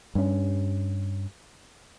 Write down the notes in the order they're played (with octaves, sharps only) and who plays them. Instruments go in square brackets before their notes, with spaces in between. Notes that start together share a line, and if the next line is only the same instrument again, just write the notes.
[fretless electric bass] G2 C#4